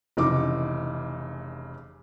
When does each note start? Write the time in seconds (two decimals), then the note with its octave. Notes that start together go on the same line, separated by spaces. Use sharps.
0.17 F1 C#3 E3 D#4 D6